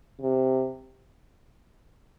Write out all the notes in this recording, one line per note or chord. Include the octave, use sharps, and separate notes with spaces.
C3